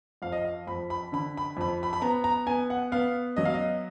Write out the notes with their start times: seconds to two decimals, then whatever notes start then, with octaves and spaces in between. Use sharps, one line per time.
0.22 F2 F5
0.32 D#5
0.44 F5
0.67 F2 B5
0.90 B5
1.12 D3 B5
1.37 B5
1.57 F2 B5
1.83 B5
1.93 B5
2.01 B3 A#5
2.24 A#5
2.46 B3 G#5
2.70 F#5
2.92 B3 F5
3.36 F#3 D#5
3.45 F5
3.54 D#5